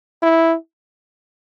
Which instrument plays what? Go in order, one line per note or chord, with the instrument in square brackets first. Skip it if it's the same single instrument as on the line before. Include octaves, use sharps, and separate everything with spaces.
[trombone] E4